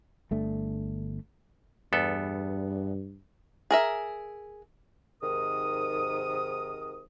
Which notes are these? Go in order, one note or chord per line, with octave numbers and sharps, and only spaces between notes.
G1 A3 D4
E2 G2 B3 A4
G#4 A#4 E5
G#2 C3 D#3 A#4 D#6